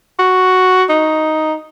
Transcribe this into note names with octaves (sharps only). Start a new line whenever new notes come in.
F#4
D#4